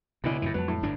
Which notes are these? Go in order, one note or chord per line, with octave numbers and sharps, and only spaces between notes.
C#2 B2 D3 E4 B5
F#2 A2 C3 E3
F2 F#3 G#3 B3 B4 A5
A2
G1 G2 D4